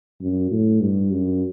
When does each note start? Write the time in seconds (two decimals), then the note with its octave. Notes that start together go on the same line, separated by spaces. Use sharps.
0.21 F#2
0.51 A2
0.81 G2
1.11 F#2